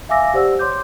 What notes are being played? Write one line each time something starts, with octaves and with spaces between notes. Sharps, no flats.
E5 F5 G#5 D6 E6 A#6
G4 C5 D5 F#5 E6
C#5 C6 D6 G6